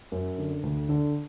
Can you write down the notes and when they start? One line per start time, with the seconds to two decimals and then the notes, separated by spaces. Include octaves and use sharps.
0.12 F#2
0.38 D3
0.63 D2
0.89 D3